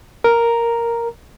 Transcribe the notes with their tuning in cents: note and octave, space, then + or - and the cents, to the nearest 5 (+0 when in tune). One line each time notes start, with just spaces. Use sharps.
A#4 +0 A#5 +0